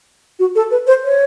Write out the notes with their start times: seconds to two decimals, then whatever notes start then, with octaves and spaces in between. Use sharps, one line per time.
0.39 F#4
0.55 A4
0.71 B4
0.87 C5
1.04 C#5